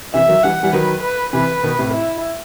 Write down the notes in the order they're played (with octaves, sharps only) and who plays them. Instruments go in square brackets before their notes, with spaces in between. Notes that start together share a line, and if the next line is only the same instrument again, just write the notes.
[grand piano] C3 E3 [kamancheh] E5
[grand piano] D#3 F#3
[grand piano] E3 G3 [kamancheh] F#5
[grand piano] E3 G3
[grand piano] D#3 F#3 [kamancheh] B4
[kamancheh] B4
[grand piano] C3 E3 [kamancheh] B4
[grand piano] B2 D#3
A2 C3
[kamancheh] E4